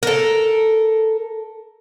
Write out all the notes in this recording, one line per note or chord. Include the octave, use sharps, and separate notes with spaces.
A4 A#4